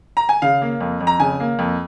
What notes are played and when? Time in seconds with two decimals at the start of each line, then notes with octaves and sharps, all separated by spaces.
0.17 A#5
0.29 G#5
0.42 C#3 F5
0.62 A#3
0.80 F2
1.01 F2
1.07 A#5
1.20 C#3 G#5
1.40 A#3
1.59 F2